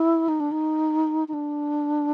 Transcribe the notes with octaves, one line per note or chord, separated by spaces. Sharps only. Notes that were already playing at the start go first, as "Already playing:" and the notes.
Already playing: E4
D#4
D4
D#4
D#4
D4